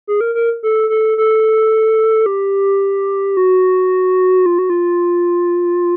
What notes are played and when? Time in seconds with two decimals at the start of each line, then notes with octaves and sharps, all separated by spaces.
0.07 G#4
0.21 A#4
0.35 A#4
0.63 A4
0.90 A4
1.18 A4
2.26 G4
3.37 F#4
4.46 F4
4.59 F#4
4.70 F4